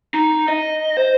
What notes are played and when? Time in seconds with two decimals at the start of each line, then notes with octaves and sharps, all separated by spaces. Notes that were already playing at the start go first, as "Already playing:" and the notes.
0.14 D#4
0.48 D#5
0.97 C5